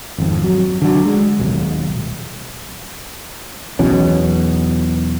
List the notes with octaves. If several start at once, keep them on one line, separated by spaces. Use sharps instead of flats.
G#1 F2
F#3
D3 F#3
G#3
D#1 B1
B1 E2 B2 C#4